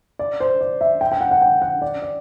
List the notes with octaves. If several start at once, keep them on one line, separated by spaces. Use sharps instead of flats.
D5
C5
D5
E5
G5
G5
F#5
F#5
G5
F#5
D5
D5